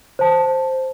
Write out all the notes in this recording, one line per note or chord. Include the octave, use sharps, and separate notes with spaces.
C5 A5